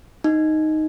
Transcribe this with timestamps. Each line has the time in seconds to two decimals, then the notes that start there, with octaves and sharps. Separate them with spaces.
0.24 D#4